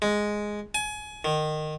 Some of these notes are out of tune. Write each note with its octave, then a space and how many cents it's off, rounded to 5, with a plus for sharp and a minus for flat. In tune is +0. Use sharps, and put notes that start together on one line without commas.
G#3 +0
G#5 +25
D#3 -20